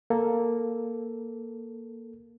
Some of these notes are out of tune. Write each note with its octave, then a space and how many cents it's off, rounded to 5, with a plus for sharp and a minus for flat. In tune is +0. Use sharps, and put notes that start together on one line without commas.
A#3 +0 A4 +0